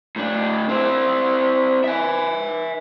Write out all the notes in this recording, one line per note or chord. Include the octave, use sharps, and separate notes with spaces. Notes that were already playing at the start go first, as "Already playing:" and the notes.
A2 D4
C4 E4
E5 G#5